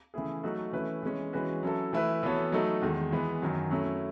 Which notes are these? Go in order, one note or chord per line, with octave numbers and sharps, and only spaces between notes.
C#3 E3 A3 E4 G#4
F#3 A3 D#4 F#4 A4
E3 A3 C#4 E4 B4
E3 G#3 C#4
E3 G#3 C#4 F#4 B4
F#3 C#4 E4 A4
E3 A3 E4 B4
E3 B3 F#4 A4 C#5
F#3 A3 D#4 A4
E2 D#3 G#3
E3 G#3 B3
F#2 D#3 F#3
F#3 A3 C#4 E4